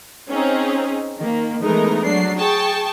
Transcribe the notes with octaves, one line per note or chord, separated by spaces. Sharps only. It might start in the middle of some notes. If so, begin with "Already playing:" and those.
C4 C#4 D#4 G#4
D#3 A#3
E3 G#3 A3 B3 D#4 A#4
F#3 D4 C7
G#4 G5 A5 C#6